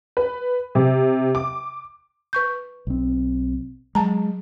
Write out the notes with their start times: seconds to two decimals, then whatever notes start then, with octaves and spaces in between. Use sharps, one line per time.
0.17 B4
0.75 C3
1.35 D6
2.33 B4 C#6 G6
2.87 B1 C4
3.95 F#3 G#3 A5 A#5